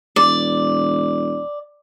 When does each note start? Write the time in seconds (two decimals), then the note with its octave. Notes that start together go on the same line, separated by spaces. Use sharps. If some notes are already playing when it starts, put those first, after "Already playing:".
0.16 E1 D5